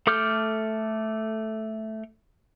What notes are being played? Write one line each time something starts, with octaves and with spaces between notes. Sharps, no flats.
A3 A4 D6 F6 G6